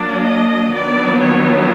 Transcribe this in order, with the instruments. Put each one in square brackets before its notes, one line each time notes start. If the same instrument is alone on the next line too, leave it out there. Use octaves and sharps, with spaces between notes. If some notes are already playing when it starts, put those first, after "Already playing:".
Already playing: [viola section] F#3 A#3 D4 D5
D#5
D#3 F#3 B3 D4 D5
C#5